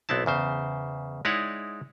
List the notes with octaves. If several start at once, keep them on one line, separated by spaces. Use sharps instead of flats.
B1 B3 C4 E4 A5
E2 C#3 C5
G#3 D#4 E4 C#5 D5 F#5